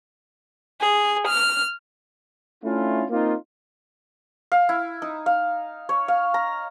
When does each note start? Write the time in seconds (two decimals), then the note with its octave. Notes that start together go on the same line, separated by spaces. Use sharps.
0.80 G#4
1.27 F6
2.64 A3 C#4 D4 E4 F4
3.10 A#3 C4 D#4 F4
4.52 F5
4.69 E4
5.02 D#4
5.26 F5
5.89 C#5
6.08 F5
6.34 A#5